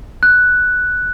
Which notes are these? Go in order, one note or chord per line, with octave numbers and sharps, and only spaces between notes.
F#6